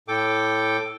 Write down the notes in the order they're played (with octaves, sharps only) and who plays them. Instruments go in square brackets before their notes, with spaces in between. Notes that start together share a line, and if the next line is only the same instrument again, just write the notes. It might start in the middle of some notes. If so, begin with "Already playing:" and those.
[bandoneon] A2 A4 G5 D6